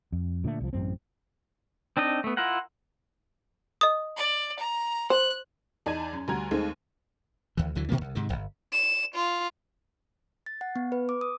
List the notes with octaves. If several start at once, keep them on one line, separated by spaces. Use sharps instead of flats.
F2
A#2 D3 E3 A3
C2 F3
A1 F#2 C4
C4 D4 D#4 D#5
A3 B3
E4 F4 A#4 F#5
D#5 D#6
D5
A#5
C5 F#6
E2 D#4 D5 A5 G#6 D#7
F#2
D2 G3 F#4 A#5 G#6
D#2 D#3 G#3 A3 C4 D#4
D2 E3
D2 D3 E3 F#3
A#2 D#3 A#3 B3
C2
G#2 C3 D#3
D1 G1
E7
F4
A6
F#5
B3
B4
D6
D#6